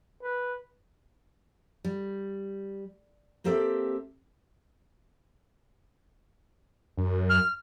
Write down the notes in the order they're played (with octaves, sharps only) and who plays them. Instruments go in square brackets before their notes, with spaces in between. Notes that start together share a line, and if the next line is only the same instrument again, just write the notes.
[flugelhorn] B4
[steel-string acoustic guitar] G3
A#3 C4 G4 A4 E5
[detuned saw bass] F#2
[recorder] F6